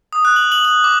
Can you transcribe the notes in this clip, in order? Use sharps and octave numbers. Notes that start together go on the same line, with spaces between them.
D#6
F#6
F#7
F#7
F#7
D6